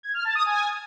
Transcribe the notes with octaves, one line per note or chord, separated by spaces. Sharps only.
G#6
F6
A5
D#6
G#5